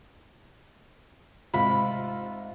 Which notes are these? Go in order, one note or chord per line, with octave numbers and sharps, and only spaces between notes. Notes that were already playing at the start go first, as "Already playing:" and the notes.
G#2 C3 F4 B5